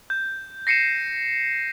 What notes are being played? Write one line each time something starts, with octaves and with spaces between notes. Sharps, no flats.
G6
A#6 C7 C#7 D#7 E7